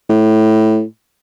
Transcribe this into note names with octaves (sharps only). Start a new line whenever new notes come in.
A2